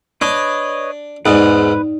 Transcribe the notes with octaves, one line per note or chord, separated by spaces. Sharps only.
D4 B4 C#5 D#5
E2 G#2 D#4 B4 D5